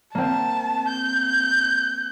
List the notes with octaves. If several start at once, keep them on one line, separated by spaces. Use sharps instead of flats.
A#3 C4 A5
G6